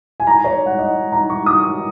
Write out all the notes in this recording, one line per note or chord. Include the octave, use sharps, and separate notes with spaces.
G#5
A#5
C#5
F#5
D#5
A#5
C#6
D#6